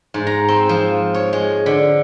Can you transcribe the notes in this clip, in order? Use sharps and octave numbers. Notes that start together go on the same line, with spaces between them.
G#2
A#5
C4
F3
C#5
G#3
D3